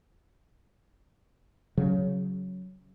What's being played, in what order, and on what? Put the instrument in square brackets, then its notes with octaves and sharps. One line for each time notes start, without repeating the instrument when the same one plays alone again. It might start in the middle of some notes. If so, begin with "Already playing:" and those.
[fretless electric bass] C#3 F#3